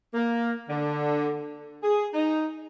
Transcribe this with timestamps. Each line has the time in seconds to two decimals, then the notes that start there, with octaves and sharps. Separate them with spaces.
0.14 A#3
0.69 D3
1.82 G#4
2.14 D#4